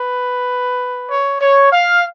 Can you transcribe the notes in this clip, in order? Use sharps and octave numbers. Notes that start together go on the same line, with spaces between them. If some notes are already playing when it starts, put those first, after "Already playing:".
Already playing: B4
C#5
C#5
F5